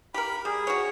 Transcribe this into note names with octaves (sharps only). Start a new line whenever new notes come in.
G4 A#4 B5
G3 G#4
F#4 C#5